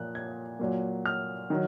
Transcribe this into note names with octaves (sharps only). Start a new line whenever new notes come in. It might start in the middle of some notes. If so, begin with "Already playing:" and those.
Already playing: A#2 F3 A#3 F#6
G#6
A#2 F#3 A#3
F6
D#3 F#3